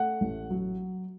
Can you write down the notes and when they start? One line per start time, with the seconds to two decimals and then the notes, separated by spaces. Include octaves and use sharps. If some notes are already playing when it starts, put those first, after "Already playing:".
Already playing: A3 F#5
0.21 A1
0.50 F#3